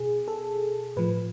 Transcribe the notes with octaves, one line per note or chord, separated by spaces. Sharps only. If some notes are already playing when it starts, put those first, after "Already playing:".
Already playing: B2 G#4
A4
A2 F3 B4